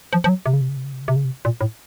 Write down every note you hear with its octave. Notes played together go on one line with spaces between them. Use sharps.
F3
F3
F#3
C3
C#3
C3
C#3
C3
C#3
C3
C#3
C3
C#3
C3
A#2
A2